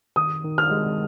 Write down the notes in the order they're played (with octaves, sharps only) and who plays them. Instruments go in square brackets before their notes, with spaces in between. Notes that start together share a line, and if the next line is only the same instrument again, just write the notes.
[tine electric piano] D#3 [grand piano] D#6
[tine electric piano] D#3
[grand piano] F6
[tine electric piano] G#3